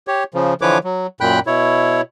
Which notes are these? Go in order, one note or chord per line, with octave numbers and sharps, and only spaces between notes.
G4 C#5
C#3 F3
D3 E3 F3 B4 C#5 D6
F#3
F#2 A#2 G5 B5 F#6
B2 E4 C#5